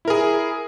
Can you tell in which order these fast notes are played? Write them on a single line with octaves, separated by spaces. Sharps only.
E4 A#4 G#4